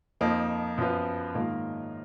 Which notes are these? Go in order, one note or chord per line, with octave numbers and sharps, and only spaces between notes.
F2 F3 A#3 D#4
F#2 F3 B3 F4
G#2 D#3 A#3 F4